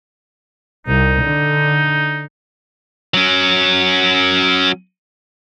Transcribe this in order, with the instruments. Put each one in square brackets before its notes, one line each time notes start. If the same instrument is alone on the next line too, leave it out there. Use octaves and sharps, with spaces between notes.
[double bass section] C2 [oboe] D#4
[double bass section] D3
[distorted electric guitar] F#3 C#4